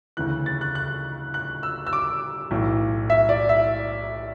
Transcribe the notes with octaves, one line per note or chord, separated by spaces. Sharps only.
D2 C#3 E3 F#6
A6
F#6
F#6
F#6
E6
E6
D6
B1 A2 E3
E5
D5
E5